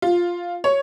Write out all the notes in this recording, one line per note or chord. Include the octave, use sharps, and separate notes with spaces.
F4
C#5